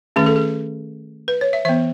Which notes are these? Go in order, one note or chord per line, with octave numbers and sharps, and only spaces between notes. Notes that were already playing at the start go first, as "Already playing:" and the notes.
D#3 A3 C#4 G#4
A4
G#4
B4
C#5
E5
E3 B3 E5